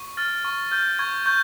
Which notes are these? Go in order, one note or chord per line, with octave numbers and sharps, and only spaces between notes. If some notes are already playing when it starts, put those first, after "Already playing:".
Already playing: C#6
F6 A6
C#6
F6 G6
C#6 G#6
C#6 G6